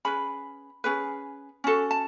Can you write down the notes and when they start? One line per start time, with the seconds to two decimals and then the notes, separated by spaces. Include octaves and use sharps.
0.05 C#4 G#4 B4 B5
0.84 C#4 G#4 B4
1.64 C#4 F#4 A4
1.91 A5